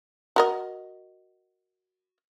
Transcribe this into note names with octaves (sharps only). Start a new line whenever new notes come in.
F#4 A#4 D#5